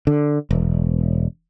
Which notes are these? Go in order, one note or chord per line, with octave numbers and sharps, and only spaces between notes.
D3
E1